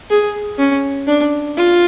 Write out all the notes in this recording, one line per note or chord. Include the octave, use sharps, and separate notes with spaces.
G#4
C#4
D4
F4